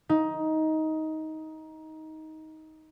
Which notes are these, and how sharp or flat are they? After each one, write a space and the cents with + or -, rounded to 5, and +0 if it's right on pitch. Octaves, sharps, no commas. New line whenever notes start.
D#4 +15